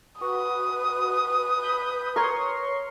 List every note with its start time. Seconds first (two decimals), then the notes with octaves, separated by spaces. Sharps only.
0.21 F#4 B4 D#6
1.63 B5 G6
2.16 A#4 C#5 C6 C#6